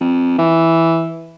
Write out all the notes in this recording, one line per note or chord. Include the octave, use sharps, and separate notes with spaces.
F2
E3